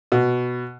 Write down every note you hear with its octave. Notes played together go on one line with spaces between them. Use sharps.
B2